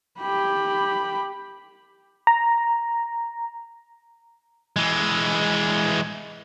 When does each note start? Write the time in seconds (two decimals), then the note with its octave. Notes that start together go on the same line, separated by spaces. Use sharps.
0.19 G4 B5
2.27 A#5
4.76 E3 G#3